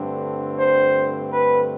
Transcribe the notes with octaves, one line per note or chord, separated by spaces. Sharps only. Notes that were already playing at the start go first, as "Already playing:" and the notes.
Already playing: G2 D3 A3 C4
C5
B4